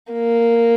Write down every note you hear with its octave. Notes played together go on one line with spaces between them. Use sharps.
A#3